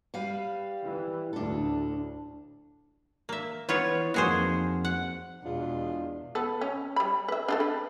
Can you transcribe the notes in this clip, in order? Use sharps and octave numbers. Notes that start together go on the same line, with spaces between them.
G3 B4 F5
E3
D2 A2 D4 A4
A#3 E5
E3 B3 F4 C#5
F2 A#3 D#4 F#4 G#4 C5
F#5
E2 B2 G#3 D4 F4
B3 A4
C#4
G3 B5
B4 E5
D4 F4 A4
B4